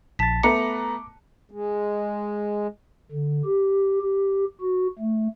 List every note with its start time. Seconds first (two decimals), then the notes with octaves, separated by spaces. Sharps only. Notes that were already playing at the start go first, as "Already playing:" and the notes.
0.19 A#1 A5 A6 B6
0.43 A3 B3 A#5 D6 C#7
1.51 G#3
3.12 D3
3.45 G4
4.01 G4
4.61 F#4
4.99 A3